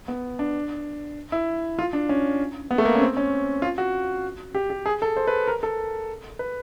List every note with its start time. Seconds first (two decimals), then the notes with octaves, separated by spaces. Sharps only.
0.08 B3
0.39 D4
1.32 E4
1.79 F4
1.93 D4
2.09 C#4
2.71 B3
2.78 A3
2.85 A#3
2.95 C#4
3.02 C4
3.17 C#4
3.62 F4
3.78 F#4
4.55 G4
4.70 G4
4.86 G#4
5.02 A4
5.17 C5
5.28 B4
5.48 A#4
5.63 A4
6.39 B4